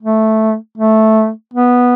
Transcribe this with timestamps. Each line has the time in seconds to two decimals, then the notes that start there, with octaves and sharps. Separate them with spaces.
0.02 A3
0.77 A3
1.53 B3